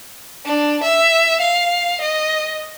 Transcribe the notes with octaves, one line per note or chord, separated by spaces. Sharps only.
D4
E5
F5
D#5